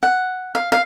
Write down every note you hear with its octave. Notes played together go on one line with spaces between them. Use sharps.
F#5
F5
F5